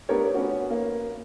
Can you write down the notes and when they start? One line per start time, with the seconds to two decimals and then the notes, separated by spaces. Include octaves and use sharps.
0.09 A3 B3 D4 G4 A#4 C#5
0.34 B3 C#4 F#4
0.70 A#3